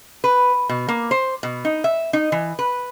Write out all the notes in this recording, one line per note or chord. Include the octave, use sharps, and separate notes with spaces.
B4
B2
A#3
C5
B2
D#4
E5
D#4
E3
B4